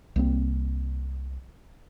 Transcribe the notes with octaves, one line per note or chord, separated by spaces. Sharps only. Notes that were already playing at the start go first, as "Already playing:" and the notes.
C2 A#3 C4